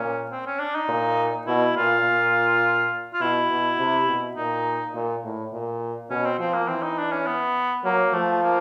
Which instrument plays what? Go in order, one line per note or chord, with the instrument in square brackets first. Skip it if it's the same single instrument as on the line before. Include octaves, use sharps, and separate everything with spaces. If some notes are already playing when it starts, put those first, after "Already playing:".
Already playing: [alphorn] A#2 [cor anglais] C#4
[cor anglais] C4
C#4
D4
D#4
[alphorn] A#2
[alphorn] B2 [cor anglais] E4
[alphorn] A#2 [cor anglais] F4
[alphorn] A#2
[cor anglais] F4
[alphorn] B2 [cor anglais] E4
[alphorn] B2
C3
B2
[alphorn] A#2 [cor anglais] D#4
[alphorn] A#2
A2
A#2
[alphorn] B2 [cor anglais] C#4
[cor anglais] C4
[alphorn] F3 [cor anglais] C4
[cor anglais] A#3
[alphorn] E3 [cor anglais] C4
[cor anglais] D#4
D4
C#4
B3
[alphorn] F#3 [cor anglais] A#3
[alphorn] F3 [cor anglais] A3
[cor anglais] A#3